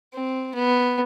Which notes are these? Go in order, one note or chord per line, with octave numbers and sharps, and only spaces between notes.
C4
B3